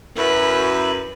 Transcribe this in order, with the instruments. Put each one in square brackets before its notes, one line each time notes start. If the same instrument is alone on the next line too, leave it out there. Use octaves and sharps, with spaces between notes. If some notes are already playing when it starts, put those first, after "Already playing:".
[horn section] F#2 [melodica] E4 [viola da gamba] B4